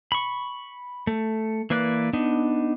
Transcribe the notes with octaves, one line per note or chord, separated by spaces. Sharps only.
B5 C#6
A3
E3 A#3 B4 D5
B3 D4 D#4